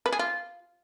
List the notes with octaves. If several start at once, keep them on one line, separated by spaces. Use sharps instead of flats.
B4
G#4
F4